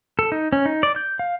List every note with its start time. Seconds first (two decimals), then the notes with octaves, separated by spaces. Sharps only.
0.19 A4
0.32 D#4
0.53 C#4
0.66 D#4
0.83 D5
0.96 G6
1.19 F5